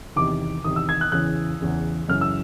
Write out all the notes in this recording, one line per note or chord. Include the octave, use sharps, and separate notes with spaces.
E2 C3 D#3 D6
E2 C3 D#3 D#6
E6
G#6
F#6
E2 C#3 E3 F#6
E2 C#3 E3
F#2 C#3 E3 F6
E6